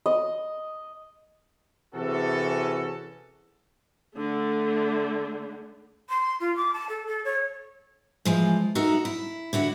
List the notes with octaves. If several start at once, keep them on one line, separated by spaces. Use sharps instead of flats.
D#5
C3 E3 C#4 F#4 G#4 A4
D3 A3
C6
F4
D6
A5
A4
A4
C#5
E3 F3 G#3
D#4 F#4 A4 A#4 E5
E4
D3 E4 F#4